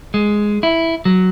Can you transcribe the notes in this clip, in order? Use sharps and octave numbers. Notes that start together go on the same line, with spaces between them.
G#3
E4
F#3